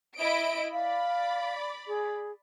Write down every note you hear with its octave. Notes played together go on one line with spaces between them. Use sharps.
E4 D#5 D7
D5 F5 B5
G#4